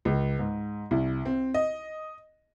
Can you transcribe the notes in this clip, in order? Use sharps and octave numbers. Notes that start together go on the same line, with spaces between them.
C#2
G#2
C2
C4
D#5